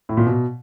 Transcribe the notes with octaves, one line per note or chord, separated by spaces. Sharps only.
A2
A#2
B2